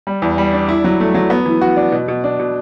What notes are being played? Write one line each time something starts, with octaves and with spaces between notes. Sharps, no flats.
G3
E2
G3
D4
E4
F#3
A3
F#3
B3
E3
F#4
D4
B2
B2
D4
B2